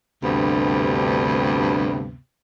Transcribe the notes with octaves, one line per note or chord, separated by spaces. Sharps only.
D2 G2 C3 B3